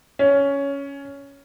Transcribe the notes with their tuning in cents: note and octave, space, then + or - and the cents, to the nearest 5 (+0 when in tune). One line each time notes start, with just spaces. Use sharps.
C#4 +10